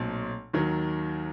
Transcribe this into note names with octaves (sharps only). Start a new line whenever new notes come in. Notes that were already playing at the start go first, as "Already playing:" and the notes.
Already playing: B1 A#2 F#3 A3 C4
D#2 D#3 F#3